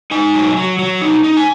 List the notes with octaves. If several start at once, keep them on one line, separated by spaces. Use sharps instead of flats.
D#4 G#5
F#3
F#3
F#3
D#4
D#4
G#5